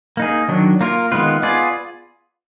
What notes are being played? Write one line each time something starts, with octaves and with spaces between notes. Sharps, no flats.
A#3 D#4 G#4
D#3 F#3 D4
A#3 F4 A#4
D#3 G#3 B3 F4 B4
B3 F4 G#4 D5